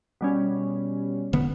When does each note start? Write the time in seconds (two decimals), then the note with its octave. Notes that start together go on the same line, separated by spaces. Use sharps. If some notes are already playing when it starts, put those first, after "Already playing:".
0.21 B2 G3 C#4
1.33 E1 D3 B3